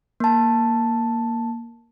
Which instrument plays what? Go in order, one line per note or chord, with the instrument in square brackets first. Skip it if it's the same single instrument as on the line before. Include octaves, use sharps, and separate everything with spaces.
[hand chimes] A#3 A5